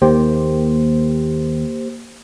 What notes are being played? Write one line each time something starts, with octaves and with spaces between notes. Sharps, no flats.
D#2 A#3 G4 C5